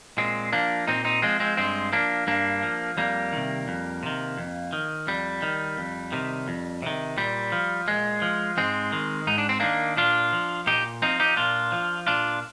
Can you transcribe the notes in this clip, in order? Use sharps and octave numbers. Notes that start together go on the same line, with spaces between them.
A#2 G#3 C4
F3 A#3 D4
A#2 C4 D#4
C4 D#4
F3 G#3 C4
G#3 C4
G2 G#3 C4
F3 A#3 D4
G2 A#3 D4
F3
F2 G3 A#3
C3 D#3
F2
C3 D#3
F2
D#3
F2 G3
D#3
F2
C3 D#3
F2
C3 D#3
A#2 G3
F3
A#2 G#3
F3
G#2 G#3 C4
D#3
G#2 D#4
D4
C4
D#3 A#3 D4
A#2 D4 F4
F3
A#2 D#4 G4
F3 C4 D#4
D#4 G4
A#2 D4 F4
F3
A#2 D4 F4